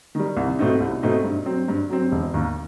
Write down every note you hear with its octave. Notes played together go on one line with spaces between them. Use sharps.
D#3 G3
C2
B2 A3 C4 D#4
C2
B2 A3 C4 D#4
G2
F#3 C4
G2
F#3 C4
E1
D#2 D#3